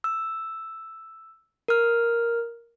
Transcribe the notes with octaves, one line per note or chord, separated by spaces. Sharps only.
E6
A#4 F6